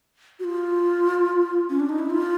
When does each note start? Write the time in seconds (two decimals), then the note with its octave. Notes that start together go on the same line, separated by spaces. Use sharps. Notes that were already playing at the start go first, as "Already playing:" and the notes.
0.39 F#4
0.44 F4
1.70 C#4
1.80 D4
1.89 D#4
1.99 E4
2.10 F4